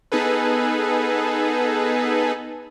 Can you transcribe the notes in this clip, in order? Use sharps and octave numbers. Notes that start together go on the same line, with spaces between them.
B3 D#4 G#4 A4 B4